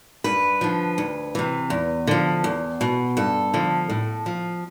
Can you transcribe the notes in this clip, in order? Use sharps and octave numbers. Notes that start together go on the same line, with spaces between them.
G2 B4
D3 F3
D2
C3 E3
E2
D3 F3
E2
B2
G2 A4
D3 F3
A2
F3